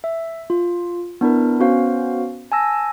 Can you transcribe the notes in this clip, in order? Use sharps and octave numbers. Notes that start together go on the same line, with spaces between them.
E5
F4
B3 D4 E4 A#4
B3 C#4 F#4 C5 F5
G#5 A5 E6 A#6